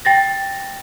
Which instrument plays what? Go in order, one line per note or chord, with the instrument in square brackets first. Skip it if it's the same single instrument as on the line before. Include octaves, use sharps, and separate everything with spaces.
[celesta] G5 A6 A#6